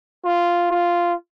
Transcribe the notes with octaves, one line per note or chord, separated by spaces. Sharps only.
F4
F4